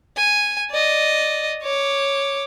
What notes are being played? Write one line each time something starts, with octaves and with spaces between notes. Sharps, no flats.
G#5
D5 D#5
C#5 D6